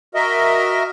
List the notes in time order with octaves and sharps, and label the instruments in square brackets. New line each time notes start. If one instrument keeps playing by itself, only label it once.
[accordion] F#4 A#4 D#5 E5